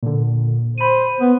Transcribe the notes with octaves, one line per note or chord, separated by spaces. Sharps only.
A#2 D3
C5 B5 D#7
B3